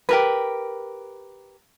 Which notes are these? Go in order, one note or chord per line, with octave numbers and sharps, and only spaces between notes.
G4 A#4 B4